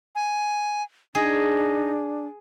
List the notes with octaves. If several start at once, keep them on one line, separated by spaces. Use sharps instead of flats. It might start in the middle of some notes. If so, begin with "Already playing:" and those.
G#5
D4 D#4 G#4